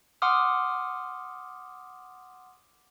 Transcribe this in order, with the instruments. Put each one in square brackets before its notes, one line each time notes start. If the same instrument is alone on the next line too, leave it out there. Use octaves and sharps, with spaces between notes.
[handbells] F#5 C6 D6 D#6 F6